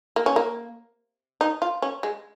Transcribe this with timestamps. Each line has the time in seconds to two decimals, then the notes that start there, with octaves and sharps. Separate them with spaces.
0.16 A#3
0.26 C#4
0.36 A#3
1.41 D#4
1.62 F4
1.82 C#4
2.03 G#3